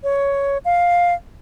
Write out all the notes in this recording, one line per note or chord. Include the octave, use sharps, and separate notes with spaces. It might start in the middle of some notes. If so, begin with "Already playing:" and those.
C#5
F5